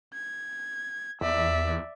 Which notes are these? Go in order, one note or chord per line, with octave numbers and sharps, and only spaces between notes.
G#6
E2 D5 E5